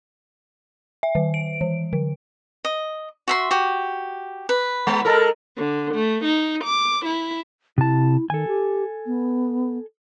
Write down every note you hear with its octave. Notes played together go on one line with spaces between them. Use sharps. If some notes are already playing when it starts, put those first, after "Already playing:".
E5
D#3
D7
E3
D3
D#5
F#4 E5 C6
F#4 G4
B4
G#3 B3
G#3 A4 A#4
D3
A3
D#4
D6
E4
C3 E4 A5
D#3 A4 G#5
G4
B3